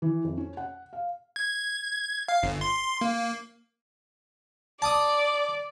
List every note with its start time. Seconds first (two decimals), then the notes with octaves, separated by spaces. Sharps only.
0.02 E3
0.24 F2
0.37 C#4
0.57 F#5
0.93 F5
1.36 G#6
2.28 F5
2.43 G1
2.61 C6
3.01 A#3
4.82 D5 A5 D6 D#6